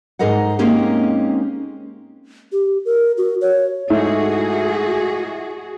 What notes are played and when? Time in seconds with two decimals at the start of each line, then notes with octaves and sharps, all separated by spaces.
0.19 G#2 D#4 G#4 A#4 D#5 F#5
0.59 G#3 A#3 C4 C#4 D#4 G4
2.52 G4
2.85 A#4
3.17 F#4
3.41 C#5
3.90 G#2 A3 E4 F#4 G#4